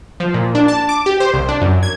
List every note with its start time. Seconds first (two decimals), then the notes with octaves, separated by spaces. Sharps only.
0.20 F3
0.34 A#2
0.55 D4
0.68 A5
0.89 D6
1.06 G4
1.20 C5
1.34 C2
1.49 D4
1.61 F#2
1.83 G#6